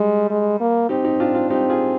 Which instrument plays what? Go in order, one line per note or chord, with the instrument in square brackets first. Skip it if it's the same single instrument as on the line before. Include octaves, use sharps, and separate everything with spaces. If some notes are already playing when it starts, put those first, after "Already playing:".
Already playing: [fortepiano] G3 [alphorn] G#3
[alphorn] G#3
A#3
[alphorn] C4 [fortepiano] D#4 G4
[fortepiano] D#4 G4
D4 F4
D4 F4
[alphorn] C4 [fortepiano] D#4 G4
[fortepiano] F4 G#4